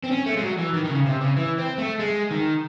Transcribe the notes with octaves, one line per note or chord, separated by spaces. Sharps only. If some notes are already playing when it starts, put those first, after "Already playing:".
C4
C#4
A3
G#3
F#3
E3
D#3
D#3
C#3
C3
C#3
E3
C4
A3
G#3
D#3